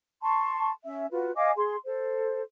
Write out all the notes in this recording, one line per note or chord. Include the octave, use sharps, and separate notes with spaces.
A5 C6 C#6
C#4 E5
F4 F#4 B4
D#5 F5 G#5 D6
G#4 C6
A4 C5